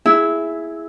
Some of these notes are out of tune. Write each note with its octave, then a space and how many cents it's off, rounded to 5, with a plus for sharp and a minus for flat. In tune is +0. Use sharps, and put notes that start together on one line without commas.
E4 +0 G#4 +0 E6 -15